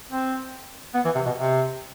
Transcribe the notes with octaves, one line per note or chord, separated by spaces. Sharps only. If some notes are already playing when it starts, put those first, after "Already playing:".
C4
B3
E3
C3
B2
C3